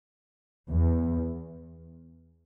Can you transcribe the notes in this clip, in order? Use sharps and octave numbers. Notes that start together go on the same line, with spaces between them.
E2